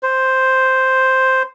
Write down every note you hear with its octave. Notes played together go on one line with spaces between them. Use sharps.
C5